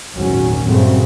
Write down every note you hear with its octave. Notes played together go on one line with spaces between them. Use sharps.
G#1 E2 A#2 F#3 C#4
G2 A#2 C#3 F#3 A3 C4